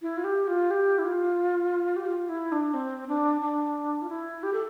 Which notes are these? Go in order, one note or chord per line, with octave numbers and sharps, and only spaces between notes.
E4
F4
G4
F4
G4
E4
F4
G4
F4
E4
D4
C4
D4
D4
F4
E4
G4
A4